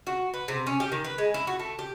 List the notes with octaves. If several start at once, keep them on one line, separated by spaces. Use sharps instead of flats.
F#4
B4
C3
C#4
G4
D#3
B4
G#3
E4
F#4
A3
G4